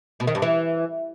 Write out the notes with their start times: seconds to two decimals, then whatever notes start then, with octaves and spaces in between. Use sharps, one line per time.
0.20 B2
0.27 D#3
0.35 G2
0.42 E3